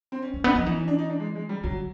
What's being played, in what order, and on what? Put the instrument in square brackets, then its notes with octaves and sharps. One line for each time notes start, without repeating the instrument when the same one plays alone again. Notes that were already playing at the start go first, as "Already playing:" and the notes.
[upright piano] C4
C#4
[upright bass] A3 [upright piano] C#4
[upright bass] B3 [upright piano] D4
[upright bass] F3 [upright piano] D#4
[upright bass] E3 [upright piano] D#4
[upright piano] C#4
D4
D#4
D4
G#3
G#3
G3
[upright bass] D3 [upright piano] F#3